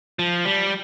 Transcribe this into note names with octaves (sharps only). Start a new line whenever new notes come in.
F3
G3